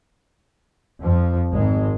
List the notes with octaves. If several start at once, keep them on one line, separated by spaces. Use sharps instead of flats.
F2 F3
G#1 G#3